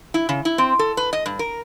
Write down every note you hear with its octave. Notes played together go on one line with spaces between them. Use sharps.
E4
C#3
E4
C4
A4
B4
D#5
G2
A#4